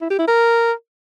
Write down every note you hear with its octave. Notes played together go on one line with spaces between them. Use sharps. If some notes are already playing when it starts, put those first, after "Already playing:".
E4
G4
E4
A#4